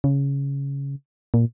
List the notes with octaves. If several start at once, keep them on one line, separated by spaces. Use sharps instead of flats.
C#3
A#2